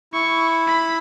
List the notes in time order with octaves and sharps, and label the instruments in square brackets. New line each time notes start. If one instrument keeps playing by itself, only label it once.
[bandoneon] E4 [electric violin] C#6
[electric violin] B5